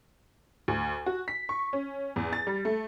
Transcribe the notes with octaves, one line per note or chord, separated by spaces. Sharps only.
D2
F#4
B6
C#6
C#4
E2
A6
G3
A3